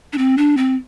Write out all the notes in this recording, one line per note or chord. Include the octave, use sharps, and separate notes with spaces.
D4
C4
D4
C4